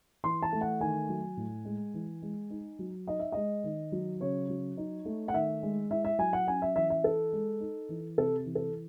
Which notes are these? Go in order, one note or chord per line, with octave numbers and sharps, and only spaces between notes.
E3 C6
A5
A3
F#5
D#3 G#5
F#3
A2
G#3
E3
G#3
D#4
F#3
D#4 D#5
E5
G#3 D#5
D#3
F#3
C#3 C#5
F#3
D#4
A3
F#5
D#3 E5
G#3
E4 E5
E5
F#3 G#5
F#5
C#4 G#5
E5
E3 E5
E5
E4 A4
G#3
D#4
E3
C3 A4
E3
A4